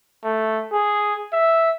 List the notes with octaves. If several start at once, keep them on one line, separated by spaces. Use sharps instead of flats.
A3
G#4
E5